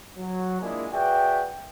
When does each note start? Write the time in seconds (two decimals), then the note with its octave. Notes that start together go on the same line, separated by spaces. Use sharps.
0.17 F#3
0.60 G#3 A#3 D4 E4 F4 G#4
0.92 F#4 G#4 B4 D5 E5 G5